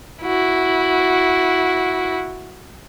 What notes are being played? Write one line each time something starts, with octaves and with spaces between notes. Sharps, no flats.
E4 F#4